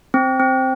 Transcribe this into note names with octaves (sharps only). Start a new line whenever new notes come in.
C4
C4